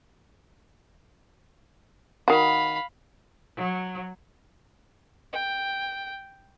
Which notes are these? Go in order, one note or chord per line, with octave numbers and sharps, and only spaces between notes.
D#3 F#4 F5 B5
F#3
G5